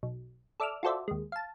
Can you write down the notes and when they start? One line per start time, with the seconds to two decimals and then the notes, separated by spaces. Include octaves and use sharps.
0.03 B1
0.60 A4 D5 E5 D6 E6 F6
0.83 F4 F#4 A4 C5 D5 E5
1.08 D#2 G#3
1.32 F5 A5